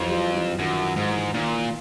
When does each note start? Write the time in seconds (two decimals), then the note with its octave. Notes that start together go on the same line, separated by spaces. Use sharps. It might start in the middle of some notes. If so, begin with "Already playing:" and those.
Already playing: F2 E3 F#3
0.09 F3 G3
0.34 E3 F#3
0.59 F#2 D#3 F3
0.83 D#3
0.96 G#2
1.08 E3
1.34 A#2 D#3
1.53 E3